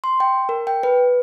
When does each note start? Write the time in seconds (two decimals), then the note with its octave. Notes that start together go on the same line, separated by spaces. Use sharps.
0.04 C6
0.20 G5
0.49 A#4
0.67 G5
0.83 B4